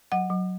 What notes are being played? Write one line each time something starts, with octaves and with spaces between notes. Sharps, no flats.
F#3 F#5
F#3